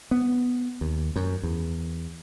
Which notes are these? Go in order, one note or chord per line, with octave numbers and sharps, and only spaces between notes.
B3
D#2
F#2
E2